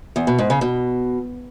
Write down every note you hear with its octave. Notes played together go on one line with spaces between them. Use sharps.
E2
B2
G#2
C#3
B2